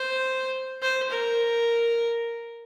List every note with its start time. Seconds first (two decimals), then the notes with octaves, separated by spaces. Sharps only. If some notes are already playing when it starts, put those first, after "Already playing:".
Already playing: C5
0.82 C5
1.10 A#4